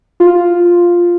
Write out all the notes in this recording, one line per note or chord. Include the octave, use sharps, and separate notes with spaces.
F4